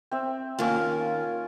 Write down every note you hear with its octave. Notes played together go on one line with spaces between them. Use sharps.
C4 E5
D#3 A#3 C#4 F4